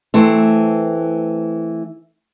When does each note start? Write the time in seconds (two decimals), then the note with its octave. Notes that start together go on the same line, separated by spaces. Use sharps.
0.14 E3 A3 C4